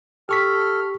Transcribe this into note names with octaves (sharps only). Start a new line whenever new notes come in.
G4 A4 C#6 F6 B6